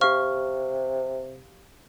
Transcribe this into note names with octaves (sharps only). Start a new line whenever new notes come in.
C3 G4 F5 C#6 F6